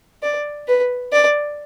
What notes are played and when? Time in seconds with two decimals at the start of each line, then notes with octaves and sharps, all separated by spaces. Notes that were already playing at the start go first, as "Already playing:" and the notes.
0.23 D5
0.68 B4
1.13 D5